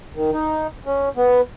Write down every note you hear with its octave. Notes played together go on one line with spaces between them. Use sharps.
D#3
D#4
C#4
B3